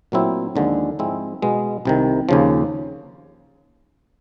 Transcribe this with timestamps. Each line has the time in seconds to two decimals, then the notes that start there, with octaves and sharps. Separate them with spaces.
0.12 A#2 F#3 A3 C4 E4
0.56 D#2 D3 F3 G#3 C#4
0.99 G#2 F3 G#3 C4 E4
1.42 B2 G#3 B3
1.85 C2 C3 D#3
2.29 D#2 C#3 F3